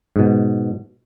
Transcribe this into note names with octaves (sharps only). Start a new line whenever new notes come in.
G#2 B2